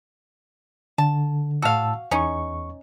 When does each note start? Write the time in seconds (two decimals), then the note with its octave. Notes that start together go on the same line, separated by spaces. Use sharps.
0.98 D3 A5
1.62 A2 F#4 F5 A5 E6
2.11 E2 C#4 D#4 C#6